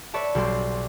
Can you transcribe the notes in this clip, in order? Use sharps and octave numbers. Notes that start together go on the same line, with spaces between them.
B4 C#5 D5 E5 A5
B1 G3 C4 G4 C6